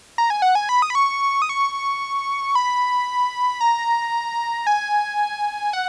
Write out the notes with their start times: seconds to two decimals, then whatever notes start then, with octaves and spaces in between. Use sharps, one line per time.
0.18 A#5
0.30 G#5
0.42 F#5
0.55 G#5
0.69 B5
0.82 D#6
0.90 B5
0.95 C#6
1.42 D#6
1.49 C#6
2.55 B5
3.61 A#5
4.67 G#5
5.73 F#5